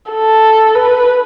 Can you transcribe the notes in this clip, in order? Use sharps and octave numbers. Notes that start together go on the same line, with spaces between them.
A4
B4